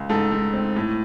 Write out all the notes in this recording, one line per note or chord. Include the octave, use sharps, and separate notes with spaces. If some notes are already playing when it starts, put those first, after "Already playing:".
Already playing: C#2
G#2 A4
G#2
C4
A2